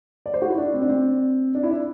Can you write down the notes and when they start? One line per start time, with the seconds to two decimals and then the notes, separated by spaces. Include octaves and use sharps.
0.26 D5
0.34 C5
0.42 F#4
0.50 E4
0.57 D4
0.74 C4
0.82 D4
0.89 C4
1.55 D4
1.63 E4
1.71 D4